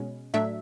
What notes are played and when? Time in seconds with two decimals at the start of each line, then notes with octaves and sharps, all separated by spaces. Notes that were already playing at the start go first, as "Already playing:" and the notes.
Already playing: B2 G#3 C#4
0.34 A2 F#3 A3 D4 E5